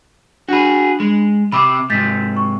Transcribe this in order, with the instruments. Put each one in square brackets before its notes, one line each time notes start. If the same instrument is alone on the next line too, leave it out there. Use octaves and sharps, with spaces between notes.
[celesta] D4 B5 [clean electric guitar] F#4 G#4
[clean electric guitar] G#3
[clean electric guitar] C3 C4 [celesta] B5 D6
[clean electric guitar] G#2 C3 [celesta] G6 A6 B6
[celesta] C#6